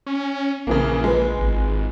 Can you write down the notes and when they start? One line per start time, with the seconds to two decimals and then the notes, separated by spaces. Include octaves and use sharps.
0.06 C#4
0.67 A#1 C#3 E3 A#3
1.04 G#3 F4 B4
1.39 G#1